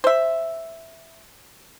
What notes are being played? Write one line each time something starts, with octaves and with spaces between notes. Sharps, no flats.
C5 E5